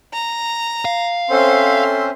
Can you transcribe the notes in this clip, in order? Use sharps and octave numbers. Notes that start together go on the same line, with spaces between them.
A#5
F5
C4 C#4 A4 C5 E5 C6